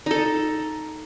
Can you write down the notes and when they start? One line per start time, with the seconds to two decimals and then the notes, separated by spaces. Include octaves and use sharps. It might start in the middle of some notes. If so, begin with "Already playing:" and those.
0.06 D#4 A4